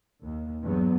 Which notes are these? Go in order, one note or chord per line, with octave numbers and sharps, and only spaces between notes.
D#2
E2 G2 F#3 B3